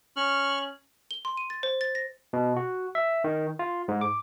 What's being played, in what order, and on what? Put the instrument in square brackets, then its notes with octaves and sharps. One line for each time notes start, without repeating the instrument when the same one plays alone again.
[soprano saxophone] C#4 [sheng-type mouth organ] C#6 F6 [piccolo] F#7
[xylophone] G7
C6
D#7
A6
C5
A6
A#6
[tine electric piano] B2
F#4
E5
D#3
F4
G#2
D6